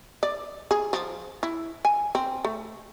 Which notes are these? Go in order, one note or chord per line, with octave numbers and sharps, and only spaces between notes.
D5
G#4
F3
E4
G#5
C4
A3